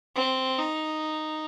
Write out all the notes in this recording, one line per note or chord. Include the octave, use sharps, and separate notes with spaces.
C4
D#4